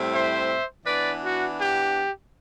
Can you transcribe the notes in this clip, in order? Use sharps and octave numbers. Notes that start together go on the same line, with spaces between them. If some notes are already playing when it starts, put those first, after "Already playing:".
Already playing: A2 G3 C4 E4
C5 E5
E3 B3 D4 B4 D5
F#4
G4